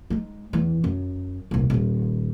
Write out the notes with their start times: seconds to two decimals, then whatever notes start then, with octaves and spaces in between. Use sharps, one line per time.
0.10 G#3 D#4
0.53 E2 E3
0.84 F#2
1.51 D#1 C2
1.70 D#1 D#3